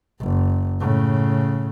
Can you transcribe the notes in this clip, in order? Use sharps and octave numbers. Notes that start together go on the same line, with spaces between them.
F#1
A2 C#3